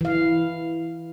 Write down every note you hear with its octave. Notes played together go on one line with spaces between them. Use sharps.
E3 F5